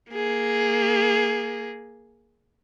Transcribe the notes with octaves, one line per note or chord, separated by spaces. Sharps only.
A#3 G#4